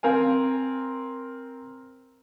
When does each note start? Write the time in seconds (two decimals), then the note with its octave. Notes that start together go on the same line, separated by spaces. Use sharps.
0.03 C4 A#4 F5 G#5